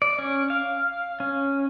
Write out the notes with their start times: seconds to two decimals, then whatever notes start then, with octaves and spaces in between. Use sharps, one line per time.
0.02 D5
0.19 C#4
0.50 F5
1.20 C#4